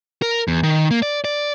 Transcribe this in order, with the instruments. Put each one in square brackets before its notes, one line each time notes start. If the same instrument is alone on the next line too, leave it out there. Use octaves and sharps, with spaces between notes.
[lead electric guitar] A#4
E2
D#3
A#3
D5
D5